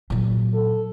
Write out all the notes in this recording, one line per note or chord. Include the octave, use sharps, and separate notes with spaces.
A#2 F#3
A4